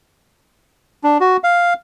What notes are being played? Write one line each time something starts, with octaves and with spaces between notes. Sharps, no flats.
D4
F#4
F5